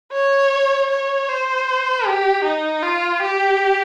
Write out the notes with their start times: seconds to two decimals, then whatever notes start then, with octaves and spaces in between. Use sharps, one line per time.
0.12 C#5
0.90 C#5
1.28 C5
2.06 G4
2.44 D#4
2.83 F4
3.22 G4